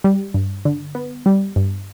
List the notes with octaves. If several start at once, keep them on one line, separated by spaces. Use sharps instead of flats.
G3
G2
D3
B3
G3
G2